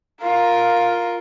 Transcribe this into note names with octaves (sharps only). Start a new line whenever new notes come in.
F4 A#4